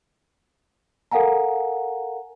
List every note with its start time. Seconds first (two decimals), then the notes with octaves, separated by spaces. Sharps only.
1.12 A4 A#4 F5 F#5 G#5 A#5